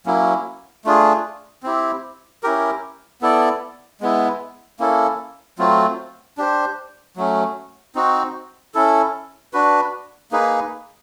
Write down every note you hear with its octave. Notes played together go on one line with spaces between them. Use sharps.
F#3 A#3 C#4 E4
A3 D4 F4 G#4
C4 E4 G4
C#4 E4 G4 A#4
B3 E4 A4 D5
G#3 B3 E4
A#3 C#4 E4 A4
F#3 A3 C4 F4
D4 G4 C5
F#3 A3 C#4
C4 D#4 F#4
C#4 E4 A4
D4 F#4 B4
A#3 D#4 G#4 B4